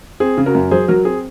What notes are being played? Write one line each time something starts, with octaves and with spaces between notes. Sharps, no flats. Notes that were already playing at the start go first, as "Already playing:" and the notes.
C4 G#4
C#3
F#4 A#4
F#2
F#3 G#4 C5
F#3 F#4 A#4
C4 G#4